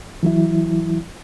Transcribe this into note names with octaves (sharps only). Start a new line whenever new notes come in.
E3 F#3 E4